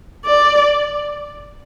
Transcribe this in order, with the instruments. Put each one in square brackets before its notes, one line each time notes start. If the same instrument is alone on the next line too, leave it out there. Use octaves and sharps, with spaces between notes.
[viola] D5